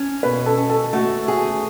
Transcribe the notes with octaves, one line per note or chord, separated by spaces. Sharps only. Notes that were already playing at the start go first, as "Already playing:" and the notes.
Already playing: C#4
B2 B4
A4
C#4
A4
A3 F#4
F#4 G#4